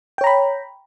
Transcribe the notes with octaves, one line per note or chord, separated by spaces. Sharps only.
C#5 G5 A#5 B5